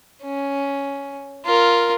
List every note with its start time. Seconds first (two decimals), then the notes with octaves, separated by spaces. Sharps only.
0.23 C#4
1.46 F4 A#4